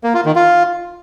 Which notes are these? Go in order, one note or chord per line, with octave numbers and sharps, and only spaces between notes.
A#3
F4
D#3
F4